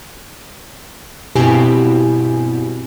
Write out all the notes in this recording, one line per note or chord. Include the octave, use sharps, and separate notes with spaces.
G2 B2 C4 E4 G4 G#5